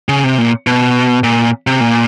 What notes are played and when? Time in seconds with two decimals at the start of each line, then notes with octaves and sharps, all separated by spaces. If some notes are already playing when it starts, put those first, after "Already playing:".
0.09 C#3
0.24 C3
0.38 A#2
0.67 B2
1.24 A#2
1.67 C3
1.80 A#2